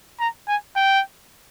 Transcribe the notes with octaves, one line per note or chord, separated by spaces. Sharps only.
A#5
G#5
G5